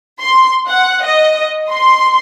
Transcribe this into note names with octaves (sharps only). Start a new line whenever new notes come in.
C6
F#5
D#5
C6